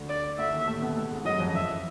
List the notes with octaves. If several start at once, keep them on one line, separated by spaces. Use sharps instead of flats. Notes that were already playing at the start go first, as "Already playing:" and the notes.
Already playing: D2 D3
D5
D2 D3 E5
D#2 D#3
A2 A3
B2 B3
A2 A3
G#2 G#3
F#2 F#3 D#5
F2 F3
F2 F3 E5
E3